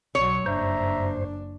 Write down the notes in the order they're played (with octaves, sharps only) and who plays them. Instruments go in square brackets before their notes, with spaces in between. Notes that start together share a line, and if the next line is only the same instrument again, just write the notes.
[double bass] B1 F#3 [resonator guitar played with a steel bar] C#5
[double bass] F#1 D4 [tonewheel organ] G2 C5 [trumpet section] E5 A#5